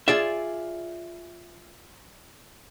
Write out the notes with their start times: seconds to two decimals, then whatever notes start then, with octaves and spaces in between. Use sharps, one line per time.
0.08 F4 G#4 D5 E5